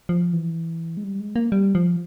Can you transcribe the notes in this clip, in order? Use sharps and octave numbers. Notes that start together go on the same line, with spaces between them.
F3
E3
G#3
G3
G#3
A#3
G3
F3